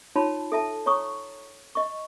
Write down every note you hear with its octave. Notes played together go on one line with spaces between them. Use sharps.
D#4 F4 C#5 A5 B5 C6
A4 E5 A5
C#5 A#5 C#6 D#6
D#5 C#6